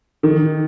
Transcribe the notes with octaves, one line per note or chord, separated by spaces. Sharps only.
D#3